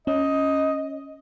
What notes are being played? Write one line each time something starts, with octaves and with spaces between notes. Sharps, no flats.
C#4 D#5